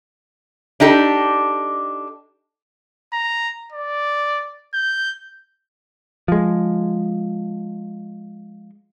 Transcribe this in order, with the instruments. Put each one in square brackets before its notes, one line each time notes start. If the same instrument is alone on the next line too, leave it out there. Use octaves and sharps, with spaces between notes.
[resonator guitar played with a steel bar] D4 D#4 G4 A4
[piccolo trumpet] A#5
D5
G6
[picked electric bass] F3 G#3